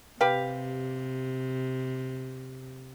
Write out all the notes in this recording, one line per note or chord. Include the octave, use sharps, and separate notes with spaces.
C3 G4 B4 F5